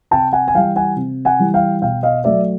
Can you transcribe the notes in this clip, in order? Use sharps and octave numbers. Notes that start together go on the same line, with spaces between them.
C3 G5 A5
F#5 G#5
G#5
E3 G3 F5 G5
F#5 G#5
C3
F#5 G#5
E3 G3
F5 G5
B2 F5 G5
D#5 F5
F#3 A3 D5 E5